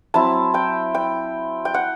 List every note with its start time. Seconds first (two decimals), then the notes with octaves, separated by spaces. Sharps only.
0.14 F#3 C4 E4 A5
0.54 G5
0.95 G5
1.65 G5
1.74 F#5